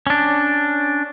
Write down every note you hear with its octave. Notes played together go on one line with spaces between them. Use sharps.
C#4 D4